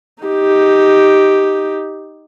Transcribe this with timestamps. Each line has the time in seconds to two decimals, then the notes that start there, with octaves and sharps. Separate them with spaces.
0.23 D#4 G4